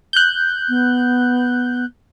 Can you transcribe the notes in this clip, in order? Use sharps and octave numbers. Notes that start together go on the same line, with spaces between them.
F#6 G6
B3